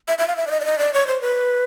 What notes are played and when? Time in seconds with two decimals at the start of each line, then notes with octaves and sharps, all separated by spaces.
0.08 E5
0.18 E5
0.27 F5
0.36 E5
0.47 D5
0.51 D#5
0.60 D5
0.65 D#5
0.79 D5
0.94 C#5
1.07 C5
1.21 B4